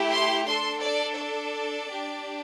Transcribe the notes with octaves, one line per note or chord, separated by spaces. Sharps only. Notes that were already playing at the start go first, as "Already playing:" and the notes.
Already playing: A3 E4 G4
C6
D4 A4 C6
D5
D5
D4 G4